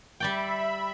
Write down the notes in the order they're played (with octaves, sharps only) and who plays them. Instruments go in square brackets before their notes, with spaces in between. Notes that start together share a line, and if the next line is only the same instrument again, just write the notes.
[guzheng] G3 D5 G5 [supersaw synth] E5 B5